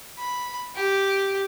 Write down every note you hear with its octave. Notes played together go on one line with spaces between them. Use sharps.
B5
G4